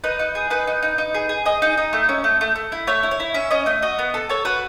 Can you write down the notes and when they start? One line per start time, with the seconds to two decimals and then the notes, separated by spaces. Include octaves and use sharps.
0.04 D#4 B4
0.19 D#4
0.35 G#4
0.50 D#4 B4
0.67 D#4
0.83 D#4
0.98 D#4
1.14 G#4
1.29 G#4
1.45 G#4 D#5
1.62 D#4
1.78 D#4
1.93 A3
2.09 C#4
2.24 A3
2.41 A3
2.56 A3
2.72 E4
2.87 A3 C#5
3.03 E4
3.11 C#5
3.20 E4
3.34 C#4 E5
3.51 C#4 D#5
3.66 A3 D#5
3.82 F#4 D#5
3.99 B3
4.14 A4
4.30 A4 C#5
4.45 F#4 B4